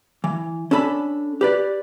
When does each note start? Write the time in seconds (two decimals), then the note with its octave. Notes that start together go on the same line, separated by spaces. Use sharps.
0.24 E3
0.71 C#4 D4 A4 B5
1.41 G4 B4 D5